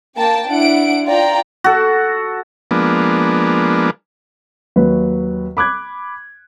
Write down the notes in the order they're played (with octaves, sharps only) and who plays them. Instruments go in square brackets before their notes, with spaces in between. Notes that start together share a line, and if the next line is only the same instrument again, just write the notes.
[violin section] A#3 G5 A5
D4 E4 F#5 D7
F4 D5 G5 A#5
[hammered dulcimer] F#4 A4
[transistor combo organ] F3 G#3 A#3 B3 D4
[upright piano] D#2 F#3 B4
B5 D6 F#6 G#6